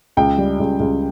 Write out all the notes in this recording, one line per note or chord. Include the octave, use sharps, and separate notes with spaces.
C#2 G5
G3
C#2
C#2